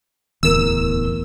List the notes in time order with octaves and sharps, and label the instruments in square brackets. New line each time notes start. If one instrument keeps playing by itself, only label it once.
[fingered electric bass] D1 [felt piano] E2 A#4 [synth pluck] E6